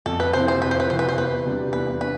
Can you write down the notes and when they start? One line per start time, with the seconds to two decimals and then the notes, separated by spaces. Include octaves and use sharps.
0.06 F2 A4
0.20 B4
0.33 C3 F3 C4 E4 C5
0.48 C5
0.62 F2 B4
0.71 C5
0.80 B4
0.90 C3 F3 C4 E4 C5
0.99 B4
1.09 C5
1.18 E2 B4
1.45 C3 G3 D4
1.73 E2 B4
2.01 D4 B4